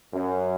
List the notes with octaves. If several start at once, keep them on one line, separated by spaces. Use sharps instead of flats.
F#2